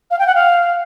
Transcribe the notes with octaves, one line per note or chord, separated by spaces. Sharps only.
F5
G5
F#5
F5